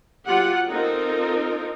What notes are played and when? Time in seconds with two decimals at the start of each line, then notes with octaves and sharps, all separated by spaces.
0.24 F#3 F4 G4 F#5
0.70 C4 D#4 F4 A4 A#4